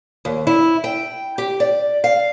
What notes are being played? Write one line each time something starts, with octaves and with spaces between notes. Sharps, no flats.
D#2
E4
G5
G4
D5
F5